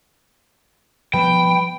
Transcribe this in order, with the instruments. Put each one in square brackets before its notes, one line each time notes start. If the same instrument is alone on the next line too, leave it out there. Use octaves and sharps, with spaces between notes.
[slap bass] F3 G3 B3 [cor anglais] B4 [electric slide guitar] G5